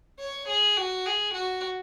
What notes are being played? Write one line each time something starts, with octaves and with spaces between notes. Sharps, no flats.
C#5
G#4
F#4
G#4
F#4